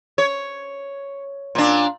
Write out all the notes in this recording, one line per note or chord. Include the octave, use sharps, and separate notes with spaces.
C#5
A#2 D4